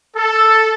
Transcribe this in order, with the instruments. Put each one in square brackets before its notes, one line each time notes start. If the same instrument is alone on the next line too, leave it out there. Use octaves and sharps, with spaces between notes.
[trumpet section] A4